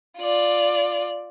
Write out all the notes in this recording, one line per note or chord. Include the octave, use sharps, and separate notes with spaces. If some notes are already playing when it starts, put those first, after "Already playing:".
F4 D5